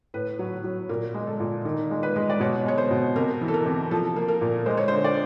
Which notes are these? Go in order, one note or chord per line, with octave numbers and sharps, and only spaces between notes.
A2 B4
F#3
F#3
A#2 A#4
G#3
A4
A#2
D#3 A#4
G#3
B4
G#3
D5
B2 C#5
G#3 C#5
C5
B2
C3 A#4
E3
A4
A#4
C3
F3 A4
A#3
A#4
A#2
G#3 C5
C#5
D3 C5
D5